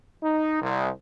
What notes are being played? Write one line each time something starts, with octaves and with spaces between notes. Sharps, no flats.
D#4
C2